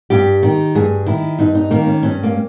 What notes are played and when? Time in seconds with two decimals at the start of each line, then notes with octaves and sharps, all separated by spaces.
0.10 G2 G4
0.43 D#3
0.75 G2 G#4
1.06 D#3 E4
1.39 G2 D#4
1.55 D#4
1.71 D#3 A#3
1.87 C#4
2.03 G2 C#4
2.23 A#3